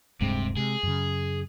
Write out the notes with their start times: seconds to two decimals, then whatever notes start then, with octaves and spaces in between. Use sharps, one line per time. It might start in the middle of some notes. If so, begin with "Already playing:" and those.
0.21 D1 G2 C3 G#3
0.57 C3 G#3 G#4
0.83 F#2 C#3